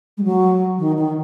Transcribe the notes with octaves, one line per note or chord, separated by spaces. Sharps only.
G#3
F#3
D#3
D#3